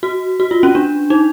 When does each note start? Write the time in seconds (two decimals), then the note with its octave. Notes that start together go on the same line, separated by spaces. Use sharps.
0.03 F#4
0.40 F#4
0.51 F4
0.63 C#4
0.75 D4
1.10 D#4